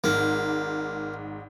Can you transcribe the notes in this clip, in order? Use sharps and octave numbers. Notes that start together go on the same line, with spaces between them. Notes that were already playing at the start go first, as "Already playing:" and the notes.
G#1 G#2 A#3